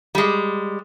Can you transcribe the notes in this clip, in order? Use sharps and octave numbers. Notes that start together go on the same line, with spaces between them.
G3 G#3